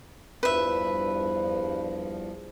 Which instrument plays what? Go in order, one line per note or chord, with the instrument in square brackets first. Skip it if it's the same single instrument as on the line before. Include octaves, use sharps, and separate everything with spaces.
[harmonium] E2 G2 F3 [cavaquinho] B4 E5